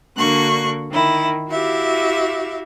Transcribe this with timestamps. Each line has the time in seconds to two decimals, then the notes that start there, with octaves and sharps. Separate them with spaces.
0.17 D3 A#3 D4 F#4 C#6 F#6
0.90 D#3 E4
1.49 E4 F#4 G4 E5 F5